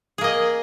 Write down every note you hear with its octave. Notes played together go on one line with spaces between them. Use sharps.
A#3 G#4 D#5